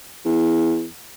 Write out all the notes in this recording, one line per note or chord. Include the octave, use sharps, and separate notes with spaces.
E2